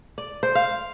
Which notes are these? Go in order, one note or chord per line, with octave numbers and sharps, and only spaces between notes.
D5
C5
F5